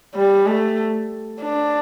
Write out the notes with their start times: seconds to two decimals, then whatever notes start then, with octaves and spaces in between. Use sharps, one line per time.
0.15 G3
0.47 A3
1.42 D4